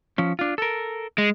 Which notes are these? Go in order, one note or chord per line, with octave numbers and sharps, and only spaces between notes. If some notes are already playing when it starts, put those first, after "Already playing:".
F3 C#4
D4 F4
A4 A#4
G#3